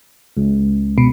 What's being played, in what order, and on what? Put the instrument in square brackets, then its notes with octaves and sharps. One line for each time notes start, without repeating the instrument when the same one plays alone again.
[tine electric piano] C#2
[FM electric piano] B2